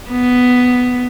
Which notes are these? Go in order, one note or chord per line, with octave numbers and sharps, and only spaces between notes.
B3